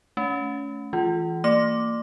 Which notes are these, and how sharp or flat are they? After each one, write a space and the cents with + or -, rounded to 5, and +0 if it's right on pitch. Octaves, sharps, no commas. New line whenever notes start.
A3 -15 C#4 +20
E3 +0 F4 +0
A#3 -30 D6 +0